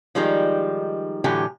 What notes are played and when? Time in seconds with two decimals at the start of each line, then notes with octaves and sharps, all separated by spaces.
0.15 D#3 F3 G3 G#3 D#4
1.24 A2 D3 E3 F#3 G4